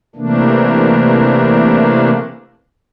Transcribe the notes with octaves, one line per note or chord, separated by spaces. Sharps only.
C3 E3 A3 A#3 D4